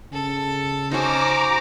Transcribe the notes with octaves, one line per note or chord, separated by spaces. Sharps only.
C#3 A4
C#4 D#4 F#4 C5 A#5 D6